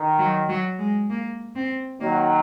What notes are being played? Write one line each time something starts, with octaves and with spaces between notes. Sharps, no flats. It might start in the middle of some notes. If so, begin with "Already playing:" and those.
Already playing: D#3
F#3
F#3
G#3
A#3
C4
D#3 F#3 A#3